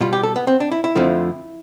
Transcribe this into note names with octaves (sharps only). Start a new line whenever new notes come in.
B2 G3 F4
G4
A4
B3
C4
D4
E4
E4
F2 D3 F3 A3